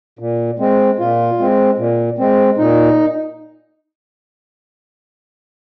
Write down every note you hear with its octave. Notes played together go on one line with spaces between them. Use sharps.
A#2
G#3 C4
A#2 F4
G#3 C4
A#2
G#3 C4
A#2 D#4